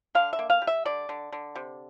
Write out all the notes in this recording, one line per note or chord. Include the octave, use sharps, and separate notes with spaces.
D3 F5
E5
A#3
F5
G3
E5
D3 D5
D3
D3
C3